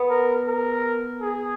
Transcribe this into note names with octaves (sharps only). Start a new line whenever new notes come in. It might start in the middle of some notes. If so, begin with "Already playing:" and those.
Already playing: B3
A#4
A#4
G#4